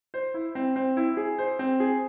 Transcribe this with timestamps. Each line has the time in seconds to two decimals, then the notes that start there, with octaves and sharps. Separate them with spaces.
0.14 C5
0.34 E4
0.55 C4
0.76 C4
0.97 E4
1.17 G#4
1.38 C5
1.59 C4
1.80 G#4